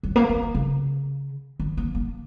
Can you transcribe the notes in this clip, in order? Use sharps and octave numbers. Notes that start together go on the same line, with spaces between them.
F#3
A#3
B3
A#3
C#3
D#3
A#3
A#3